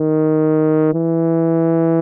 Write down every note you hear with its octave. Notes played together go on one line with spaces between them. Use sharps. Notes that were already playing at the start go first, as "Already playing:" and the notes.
Already playing: D#3
E3